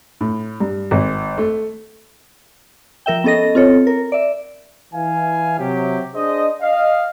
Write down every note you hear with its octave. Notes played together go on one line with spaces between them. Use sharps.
A2
G2
G#1
A3
F3 A#4 E5 G5
B3 C#4 A4 D#5 A#6
C4 F4 A4 C#5
A#4
D5 E5
E3 F5 G#5
C3 F#3 G4
D4 G#4 C5 D#5
D#5 F5